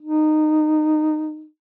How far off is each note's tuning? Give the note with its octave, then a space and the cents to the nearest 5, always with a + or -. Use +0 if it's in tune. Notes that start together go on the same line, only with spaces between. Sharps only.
D#4 -20